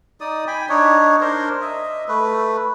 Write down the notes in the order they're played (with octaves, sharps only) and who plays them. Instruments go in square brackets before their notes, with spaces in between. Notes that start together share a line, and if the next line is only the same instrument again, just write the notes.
[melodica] D#4 D5 D#6
G5 G#5 B5
D4 D#4 C#5
D4 A#4 C5
D#5 E5
A3 B4